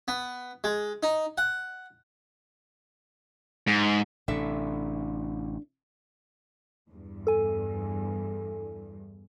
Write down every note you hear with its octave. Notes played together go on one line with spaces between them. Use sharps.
B3
G#3
D#4
F#5
G#2
A1 C3 D4 A4 E5
E2 G2
A4 G#5